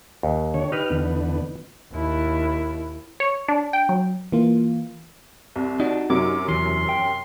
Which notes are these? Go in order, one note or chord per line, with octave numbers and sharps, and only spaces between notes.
D#2
D3 C#5
D#4 G4 B4 F6
E2 D3 B3
D#2 E4
C#5
D4
G5
F#3
E3 A#3 F4
C2
D4 D#4 F#4
F#2 C3 F#3 D6
E2 E3 C6
G5